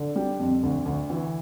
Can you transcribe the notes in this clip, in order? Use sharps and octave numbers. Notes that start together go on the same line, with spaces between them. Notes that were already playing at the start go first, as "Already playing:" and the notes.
Already playing: D3
G3
F2
D2
D2
E3